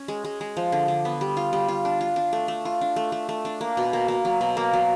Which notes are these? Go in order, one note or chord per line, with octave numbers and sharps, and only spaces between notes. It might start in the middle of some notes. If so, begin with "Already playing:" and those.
Already playing: C#4
G#3
G#3
G#3
F3
D3
D3
B3
G3
F4
G3
F4
D4
F4
D4
A3
A3
F4
D4
A3
A3
A3
D4
A#3
B2
A#3
A#3
F#3
B2
A#3
F#3